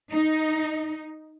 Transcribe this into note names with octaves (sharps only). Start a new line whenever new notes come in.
D#4